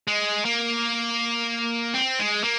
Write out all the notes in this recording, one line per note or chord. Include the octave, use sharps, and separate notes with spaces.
G#3
A#3
C4
G#3
A#3